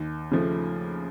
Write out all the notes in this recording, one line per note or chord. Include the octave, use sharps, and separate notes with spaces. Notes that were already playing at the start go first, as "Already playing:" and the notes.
Already playing: D#2
C#3 F3 A3